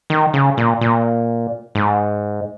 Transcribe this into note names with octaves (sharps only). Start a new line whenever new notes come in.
D#3
C#3
A#2
A#2
G#2